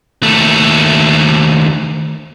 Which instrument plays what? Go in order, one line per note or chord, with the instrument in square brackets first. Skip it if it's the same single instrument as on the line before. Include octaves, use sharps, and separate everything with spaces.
[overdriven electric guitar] D#2 A3